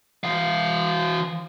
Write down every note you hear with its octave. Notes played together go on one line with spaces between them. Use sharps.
E3 F5